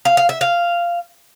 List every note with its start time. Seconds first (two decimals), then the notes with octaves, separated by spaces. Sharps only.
0.05 F5
0.17 F5
0.29 E5
0.41 F5